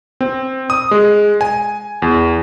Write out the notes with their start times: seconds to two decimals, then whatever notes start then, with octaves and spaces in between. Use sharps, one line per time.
0.21 C4
0.70 D#6
0.91 G#3
1.41 G#5
2.02 E2